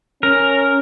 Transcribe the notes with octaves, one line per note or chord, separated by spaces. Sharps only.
C#4 A#4